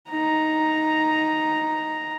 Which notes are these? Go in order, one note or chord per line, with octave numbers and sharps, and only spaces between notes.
D#4 A#5